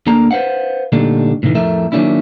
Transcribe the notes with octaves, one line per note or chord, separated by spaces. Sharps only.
D2 D3 A#3 A#5
B4 C5 D#5 F5 F#5
A#2 D3 G3 A3 D#4
A2 C3 D#3 E3
F2 A2 A3 A#4 E5
D#3 F#3 A#3 C#4 D4 E4